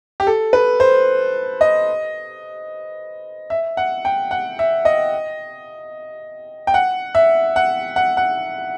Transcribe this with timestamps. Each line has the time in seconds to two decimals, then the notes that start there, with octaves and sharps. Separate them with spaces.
0.20 G4
0.27 A4
0.53 B4
0.80 C5
1.61 D#5
3.50 E5
3.77 F#5
4.05 G5
4.31 F#5
4.59 E5
4.85 D#5
6.67 G5
6.74 F#5
7.15 E5
7.56 F#5
7.96 F#5
8.17 F#5